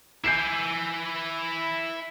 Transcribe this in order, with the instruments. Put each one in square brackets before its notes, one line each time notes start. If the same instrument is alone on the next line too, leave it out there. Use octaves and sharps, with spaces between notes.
[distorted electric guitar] E4 G#5 [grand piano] G6 C7 E7